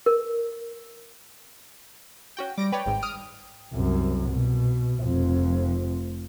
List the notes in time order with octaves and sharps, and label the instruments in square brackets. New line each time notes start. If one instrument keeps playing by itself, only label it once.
[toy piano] A#4
[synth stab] C#4 F#4 G5
[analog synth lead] G3 [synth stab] D6 A#6 D7
[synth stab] B4 C#5 D5 [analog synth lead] G5
[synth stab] G#1 G#2
D#6 F6 D7
[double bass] C2 F#2
B2
F1 F2